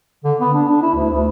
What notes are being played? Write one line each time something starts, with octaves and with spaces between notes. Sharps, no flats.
D3
B3
D4
D4
E4
D2
D2